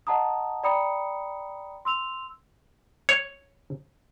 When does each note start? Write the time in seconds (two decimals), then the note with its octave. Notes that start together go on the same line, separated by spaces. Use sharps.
0.07 D#5 F#5 A5 A#5 D#6
0.63 D5 G5 A#5 B5 D#6 C#7
1.85 C6 E6 F7
3.09 C#5